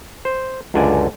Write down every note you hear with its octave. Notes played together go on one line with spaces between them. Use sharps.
C5
C#2 F#2 D3 D5 G#5